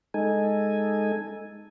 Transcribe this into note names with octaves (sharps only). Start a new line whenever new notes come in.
G#3 D#4 A4 G#5